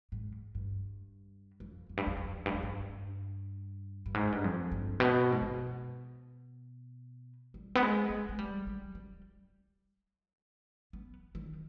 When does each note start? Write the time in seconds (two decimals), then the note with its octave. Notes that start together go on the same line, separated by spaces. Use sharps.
0.12 G#2
0.55 G2
1.60 F2
1.89 F2
1.97 G2
2.07 F2
2.17 F2
2.46 G2
2.54 F2
2.63 G2
4.06 G2
4.14 G#2
4.32 G2
4.44 F2
4.72 G2
5.00 B2
5.32 G#2
5.42 B2
7.54 G3
7.75 B3
7.83 G#3
8.10 G#3
8.29 G#3
8.39 G3
8.67 G3
8.95 G3
10.93 B3
11.35 D#3